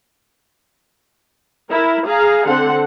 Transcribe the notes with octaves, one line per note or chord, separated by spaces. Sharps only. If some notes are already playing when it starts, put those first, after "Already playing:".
E4 A#4
G#4 F5 A#5
D3 C4 A4 F#5